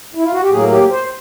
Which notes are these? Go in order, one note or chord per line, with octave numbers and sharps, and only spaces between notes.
E4
F4
F#4
G4
A2 F#3 A#3 G#4
G4
C5